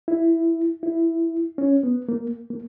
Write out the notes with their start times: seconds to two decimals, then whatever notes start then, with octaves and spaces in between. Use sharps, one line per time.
0.08 E4
0.83 E4
1.58 C#4
1.83 B3
2.09 A#3
2.50 A#3